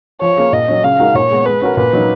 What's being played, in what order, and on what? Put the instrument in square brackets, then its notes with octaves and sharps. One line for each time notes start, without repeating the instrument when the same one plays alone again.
[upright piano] F3 [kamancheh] C#5
[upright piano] A#3 C#4 G#4
[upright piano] A#2 [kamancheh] D#5
[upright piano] F#3 C#4
[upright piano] C#3 [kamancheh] F5
[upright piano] G#3 D#4 F#4 A#4
[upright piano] A#2 [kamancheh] C#5
[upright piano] G#3 B3
[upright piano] G#3 [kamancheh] B4
[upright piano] C#4 F#4 A#4
[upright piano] A#2 [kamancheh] B4
[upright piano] F#3 A#3 D#4